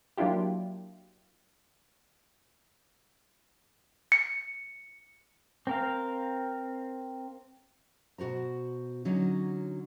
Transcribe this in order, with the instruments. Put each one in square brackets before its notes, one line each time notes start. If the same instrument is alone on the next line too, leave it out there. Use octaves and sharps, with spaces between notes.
[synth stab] F#3 A#3 D4 E4 F4 G4
[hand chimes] C#7
[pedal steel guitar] C4 A#4 F5
[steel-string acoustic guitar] B2 F#4 C5 A#5
D3 F#3 C#4 D#4